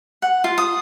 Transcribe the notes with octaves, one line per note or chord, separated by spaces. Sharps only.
F#5
F4
D#6